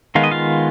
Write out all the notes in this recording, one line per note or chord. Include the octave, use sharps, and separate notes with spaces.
D#3 G#3 B3 F5
D#5
F4 F5